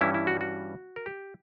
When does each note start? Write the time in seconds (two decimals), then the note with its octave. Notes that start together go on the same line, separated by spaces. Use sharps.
0.01 G2 E3 G3 C#4 E4
0.14 E4
0.27 F#4
0.41 F#4
0.96 A#4
1.06 G4